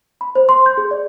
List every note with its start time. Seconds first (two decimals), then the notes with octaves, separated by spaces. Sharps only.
0.21 B5
0.35 C5
0.49 C6
0.66 G6
0.77 G#4
0.91 D5